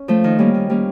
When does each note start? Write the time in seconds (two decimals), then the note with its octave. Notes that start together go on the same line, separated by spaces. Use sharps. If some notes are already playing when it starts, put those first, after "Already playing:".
Already playing: C#4
0.08 F3 A3
0.24 D#3
0.39 G3 A#3 C#4
0.54 D#3
0.70 G3 A#3 C#4